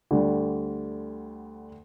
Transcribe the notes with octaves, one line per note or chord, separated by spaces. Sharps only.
D2 D3 G3